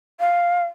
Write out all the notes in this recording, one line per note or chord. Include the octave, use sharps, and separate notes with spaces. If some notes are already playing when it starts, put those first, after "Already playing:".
F5